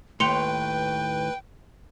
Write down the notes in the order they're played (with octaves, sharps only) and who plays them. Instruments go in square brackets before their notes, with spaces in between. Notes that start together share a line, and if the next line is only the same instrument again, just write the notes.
[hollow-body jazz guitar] D#2 A2 [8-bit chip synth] B4 [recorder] G5 [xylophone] C6 C#7 F7